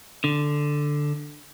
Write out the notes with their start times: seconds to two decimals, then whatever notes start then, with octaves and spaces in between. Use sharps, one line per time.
0.24 D3